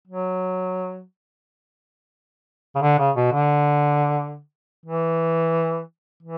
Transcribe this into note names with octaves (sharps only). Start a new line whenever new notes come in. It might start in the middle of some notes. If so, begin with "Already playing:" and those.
F#3
C#3
D3
C#3
B2
D3
E3
E3